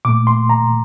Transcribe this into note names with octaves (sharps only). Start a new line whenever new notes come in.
A#2 A3 D6
C6
A#5